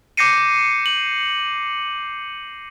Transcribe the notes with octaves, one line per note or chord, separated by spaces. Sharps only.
D6 G6 A#6 C7 C#7 D#7
F#7